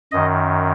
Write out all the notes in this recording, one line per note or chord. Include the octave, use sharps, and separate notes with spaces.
F#2 D#3 D#5